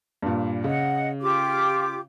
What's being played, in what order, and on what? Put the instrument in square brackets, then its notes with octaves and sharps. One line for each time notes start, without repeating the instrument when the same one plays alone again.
[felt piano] G2 A#2
[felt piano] C#3 [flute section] D#5 F#5
[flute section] F4 G4 D6